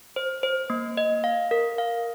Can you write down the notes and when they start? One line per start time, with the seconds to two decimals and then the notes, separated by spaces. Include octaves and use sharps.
0.16 C5
0.43 C5
0.70 A#3
0.97 D#5
1.24 F5
1.51 A#4
1.78 F5